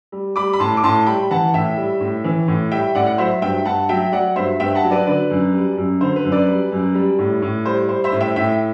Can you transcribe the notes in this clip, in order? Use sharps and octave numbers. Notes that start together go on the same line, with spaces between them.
G3
G3 B5 D6
B5
A2 A5 C6
D6
A2 A5 C6
G3 G5 B5
E3 F#5 A5
A2 E5 G5
G3
A2
E3
A2
G3 E5 G5
A2 D5 F#5
F#5
F#3 C5 E5
G2 E5 G5
G2 F#5 A5
F#3 E5 G5
F#3 D5 F#5
G2 C5 E5
G2 E5 G5
F#5 A5
F#3
B4 D5
D3 B4 D5
F#2
G3
F#2
D3 C5
B4
F#2
B4 D5
G3
F#2
G3
A2
A2
G3 C5
G3 C5
C5 E5
A2
E5 G5
A2 E5 G5